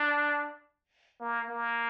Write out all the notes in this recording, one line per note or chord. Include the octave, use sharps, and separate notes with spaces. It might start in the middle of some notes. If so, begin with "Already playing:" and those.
Already playing: D4
A#3
A#3